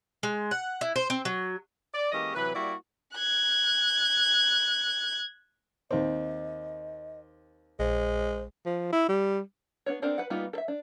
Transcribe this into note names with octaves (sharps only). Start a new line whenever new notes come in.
G#3
F#5
E4
C5
C4
F#3
D5
E3 G#3 A#3 C#4 G4 D#5
C3 E3 F#3 B4
G3 A#3 E4 F#4 D5
F#6 G#6
D#2 C4 D#5
A#1 G#3 C5
F3
E4
G3
B3 D4 C#5
B3 C4 D4 A#4 C5
B4 F#5
G3 A#3 B3 D#4 F4
A4 E5
D4